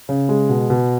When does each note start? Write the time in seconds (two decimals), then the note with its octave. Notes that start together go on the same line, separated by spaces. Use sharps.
0.09 C#3
0.29 G#3
0.49 B2
0.70 B2